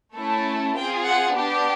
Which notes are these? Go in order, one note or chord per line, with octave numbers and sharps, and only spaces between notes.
A3 C#4 E4 A4
C4 F4 G#4 G5
F#5
B3 D4 G4